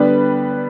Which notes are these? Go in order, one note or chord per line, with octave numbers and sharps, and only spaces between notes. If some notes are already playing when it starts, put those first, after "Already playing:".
Already playing: D3 G3 B3 D4 B4